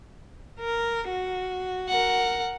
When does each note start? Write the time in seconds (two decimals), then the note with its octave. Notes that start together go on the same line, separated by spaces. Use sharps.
0.60 A#4
1.11 F#4
1.88 A#4 F#5